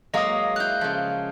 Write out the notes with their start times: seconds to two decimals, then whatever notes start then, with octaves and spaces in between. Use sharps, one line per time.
0.14 F#3 G#3 A#3 D#5 F5 D#6
0.56 E4 F5 F#6 G6
0.81 C#3 F3